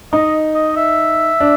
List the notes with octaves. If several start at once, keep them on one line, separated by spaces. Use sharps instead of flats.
D#4 D#5
D#5
E5
D4